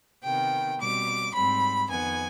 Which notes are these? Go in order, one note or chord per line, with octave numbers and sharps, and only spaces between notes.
C3 D#3 B3 G5
B2 G3 C4 D6
G#2 G3 C4 B5
F2 D#3 B3 G#5